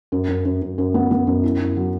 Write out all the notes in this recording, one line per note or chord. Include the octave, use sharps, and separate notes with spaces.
F#2
F#2
F#2
F#2
F#2
B3
B3
F#2
E4
E4
F#3